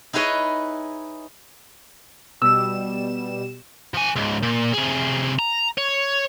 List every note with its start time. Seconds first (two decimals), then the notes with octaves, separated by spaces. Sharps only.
0.13 D#4 E4 G#4 B4 C#5 D#5
2.42 B2 G3 E6 E7
3.94 F3 G#5
4.16 C#2 G#2
4.43 A#2
4.74 C3 G#4
5.39 A#5
5.78 C#5